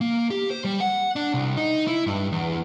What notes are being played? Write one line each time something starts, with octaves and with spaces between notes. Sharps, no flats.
A#3
G4
C5
G3
F#5
D4
C2
D#4
E4
G2
E2